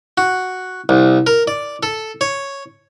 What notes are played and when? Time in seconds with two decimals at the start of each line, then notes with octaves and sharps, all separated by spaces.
0.18 F#4
0.89 C2
1.27 A#4
1.48 D5
1.83 A4
2.21 C#5